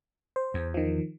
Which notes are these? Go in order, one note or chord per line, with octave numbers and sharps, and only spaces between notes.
C5
E2
D#3 F3